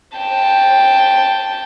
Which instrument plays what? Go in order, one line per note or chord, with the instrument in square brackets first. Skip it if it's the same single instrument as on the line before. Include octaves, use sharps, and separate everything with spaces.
[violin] G5 A5